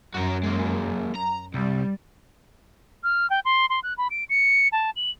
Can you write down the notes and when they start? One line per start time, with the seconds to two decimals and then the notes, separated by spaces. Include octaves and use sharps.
0.14 F#2 F#4 A#4
0.43 G#3 A#3
1.15 A#5
1.54 C2 G3
3.04 F6
3.30 G5
3.45 C6
3.70 C6
3.83 F#6
3.98 B5
4.11 D7
4.29 C#7
4.72 A5
4.96 F#7